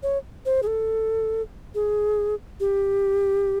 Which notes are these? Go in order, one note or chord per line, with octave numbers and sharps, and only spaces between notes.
C#5
C5
G#4
A4
G#4
G4